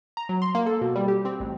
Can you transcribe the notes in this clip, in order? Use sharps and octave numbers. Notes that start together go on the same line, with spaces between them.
A#5
F#3
C6
A#3
A4
B2
G3
G4
C4
A1